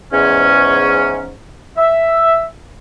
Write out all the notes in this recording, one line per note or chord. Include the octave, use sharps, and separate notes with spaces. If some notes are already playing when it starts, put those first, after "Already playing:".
E2 G#2 C#4
E5